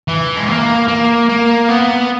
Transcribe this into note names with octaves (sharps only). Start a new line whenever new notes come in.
E3
G#3
A#3
A#3
A#3
B3